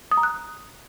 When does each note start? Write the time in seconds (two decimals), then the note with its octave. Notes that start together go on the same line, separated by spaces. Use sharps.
0.11 D#6
0.17 A#5
0.23 F#6